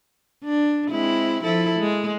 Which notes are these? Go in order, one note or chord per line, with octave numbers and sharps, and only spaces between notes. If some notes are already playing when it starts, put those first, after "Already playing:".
D4
G#3 C4 E4
F3 E4 A4
G#3